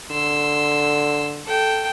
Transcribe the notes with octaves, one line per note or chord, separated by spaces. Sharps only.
D3 C6 E6
A4 G5